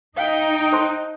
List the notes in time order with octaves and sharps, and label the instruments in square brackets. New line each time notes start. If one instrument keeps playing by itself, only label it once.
[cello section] D#4 [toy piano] F5 [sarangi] G5
[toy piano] C5 A5 C6